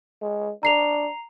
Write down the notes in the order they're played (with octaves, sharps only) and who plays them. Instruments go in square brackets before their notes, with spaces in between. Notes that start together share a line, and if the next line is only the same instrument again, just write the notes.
[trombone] G#3
[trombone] D4 [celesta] A#5 C7 F7